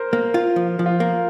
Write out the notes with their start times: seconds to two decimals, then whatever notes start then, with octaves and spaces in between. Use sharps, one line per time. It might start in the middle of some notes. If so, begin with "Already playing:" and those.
Already playing: A#4 C5
0.13 A#3
0.34 F4
0.56 F3
0.79 F3
0.86 F4
1.00 A#3